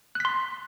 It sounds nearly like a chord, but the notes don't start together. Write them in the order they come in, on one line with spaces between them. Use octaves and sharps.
F#6 B6 C6